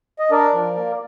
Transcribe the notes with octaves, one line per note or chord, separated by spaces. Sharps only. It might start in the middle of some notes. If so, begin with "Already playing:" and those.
D#5
D4 A#4 D5
F3
A#3